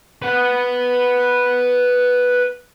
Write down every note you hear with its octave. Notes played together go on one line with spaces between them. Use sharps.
B4 F#5